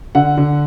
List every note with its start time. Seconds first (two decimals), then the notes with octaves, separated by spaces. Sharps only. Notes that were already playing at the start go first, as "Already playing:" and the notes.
0.15 D3 F#5
0.37 D3